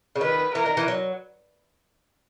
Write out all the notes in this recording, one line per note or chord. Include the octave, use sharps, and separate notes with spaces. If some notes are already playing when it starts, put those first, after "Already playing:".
C#3
D#3 B4
E3 A#4
D#3
E3
F#3